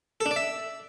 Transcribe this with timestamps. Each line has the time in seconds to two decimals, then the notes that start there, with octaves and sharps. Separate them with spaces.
0.20 A4
0.26 D4
0.31 D5
0.36 E5